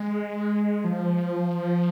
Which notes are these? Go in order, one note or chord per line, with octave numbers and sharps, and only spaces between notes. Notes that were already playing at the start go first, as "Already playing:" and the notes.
Already playing: G#3
F3